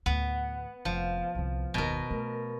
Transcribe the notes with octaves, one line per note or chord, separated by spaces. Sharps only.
D2 A2 B3
F1 F3
C2 D3
F#1 D#2 B2 A#4
A3